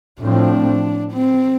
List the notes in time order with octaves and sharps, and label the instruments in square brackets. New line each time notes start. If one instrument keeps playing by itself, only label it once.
[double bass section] A2 F3 C4 [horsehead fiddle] D4
[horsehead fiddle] C4